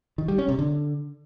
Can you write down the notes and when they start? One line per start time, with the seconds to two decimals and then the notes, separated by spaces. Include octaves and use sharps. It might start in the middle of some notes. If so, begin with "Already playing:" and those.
0.18 D#3
0.28 G3
0.38 C#4
0.49 C3
0.59 D3